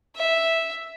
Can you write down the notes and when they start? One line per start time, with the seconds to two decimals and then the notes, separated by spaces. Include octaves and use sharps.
0.16 E5